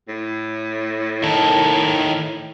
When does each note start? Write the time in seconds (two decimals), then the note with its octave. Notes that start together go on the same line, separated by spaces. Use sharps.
0.08 A2
1.24 D#3 A4